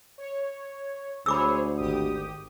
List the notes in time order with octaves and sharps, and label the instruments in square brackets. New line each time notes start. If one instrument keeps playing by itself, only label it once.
[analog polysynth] C#5
[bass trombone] D2 [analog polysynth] G#4 C5 C#5 [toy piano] B5 D6 E6
[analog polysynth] G#1 G4 D#6